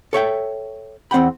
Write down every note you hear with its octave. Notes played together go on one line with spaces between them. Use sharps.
A4 C#5 E5 G5
E2 C4 F#5 G5 B5